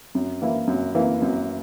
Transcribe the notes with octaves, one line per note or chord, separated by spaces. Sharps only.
F#2
E3 A#3 E4
F#2
E3 A#3 E4
F#2